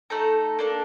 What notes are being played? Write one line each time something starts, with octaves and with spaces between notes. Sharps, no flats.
A3 D#4 A4 A#5
A#3 D4 A4